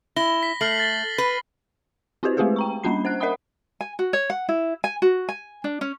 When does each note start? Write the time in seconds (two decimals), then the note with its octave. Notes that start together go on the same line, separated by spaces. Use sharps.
0.16 E4 A#6 G7
0.43 B6
0.61 A3 F6 C7 F#7
0.80 A6 G7
1.18 B4
2.23 C4 E4 F#4 G4 B4 C5
2.37 G#3 A3 C4 G4 G#4 B4
2.56 G5 A#5 C#6
2.84 G3 A#3 C#4 D4 B5 C7
3.05 C5 F#5 F#6
3.20 A#4 D#5 E5 F#5 B5 D#6
3.81 G#5
3.99 F#4
4.13 C#5
4.30 F#5
4.49 E4
4.84 G#5
5.02 F#4
5.29 G#5
5.64 D4
5.81 C#4